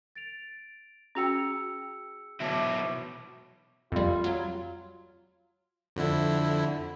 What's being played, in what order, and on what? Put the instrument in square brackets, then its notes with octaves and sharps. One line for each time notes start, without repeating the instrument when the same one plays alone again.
[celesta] A6 D7 F7
[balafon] C#4 F#4 G5 [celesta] G#4 E6 C#7
[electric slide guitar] B2 F#3 E4 [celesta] E5 A5 D6
[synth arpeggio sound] F2 G3 [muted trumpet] F4
[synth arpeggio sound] F#3
[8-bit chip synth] F2 D3 E4